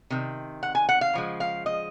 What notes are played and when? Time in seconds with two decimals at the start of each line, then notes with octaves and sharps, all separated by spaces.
0.10 C3 D#3
0.63 F#5
0.75 G#5
0.89 F#5
1.01 F5
1.13 C#3 F3 G#3
1.40 F5
1.66 D#5